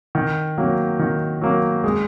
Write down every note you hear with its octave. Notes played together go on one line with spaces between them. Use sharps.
D#3
F#3 A#3
D#3
F#3 A#3
G#3